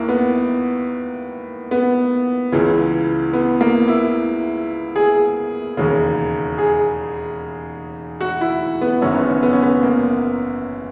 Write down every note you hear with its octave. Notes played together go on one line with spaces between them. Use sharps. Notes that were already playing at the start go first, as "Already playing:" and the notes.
Already playing: D#2 D#3 A#3 E4
B3
B3
C#2 C#3 E3
B3
A#3
E4
G#4
E1 D#2 C#3
G#4
F#4
E4
B3
F#1 F#2 D#3 C#4
B3
C#4
B3
C#4
B3
A#3